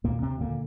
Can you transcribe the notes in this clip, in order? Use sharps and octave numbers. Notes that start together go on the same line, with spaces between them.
D#2 A#2 A#3
C3 C4
A#2 D3 A#3